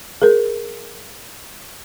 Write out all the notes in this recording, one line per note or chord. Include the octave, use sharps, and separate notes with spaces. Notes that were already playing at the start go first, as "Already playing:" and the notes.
G#4 A#4